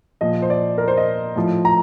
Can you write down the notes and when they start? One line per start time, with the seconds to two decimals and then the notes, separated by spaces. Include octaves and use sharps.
0.21 A#2 F3 D#5
0.42 C5
0.50 D5
0.78 A#4
0.88 C5
0.97 D#5
1.36 A2 F3
1.65 A#5